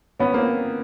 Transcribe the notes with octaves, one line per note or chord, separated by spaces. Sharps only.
B3 C#4
A#3 C4